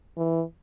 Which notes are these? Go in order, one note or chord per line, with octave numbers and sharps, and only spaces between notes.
E3